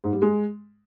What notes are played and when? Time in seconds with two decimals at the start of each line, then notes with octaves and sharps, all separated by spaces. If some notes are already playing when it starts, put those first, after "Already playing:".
0.04 G#2
0.13 G3
0.22 G#3